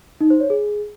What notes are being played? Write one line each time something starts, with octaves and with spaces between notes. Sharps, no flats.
D#4
C5
C#5
G#4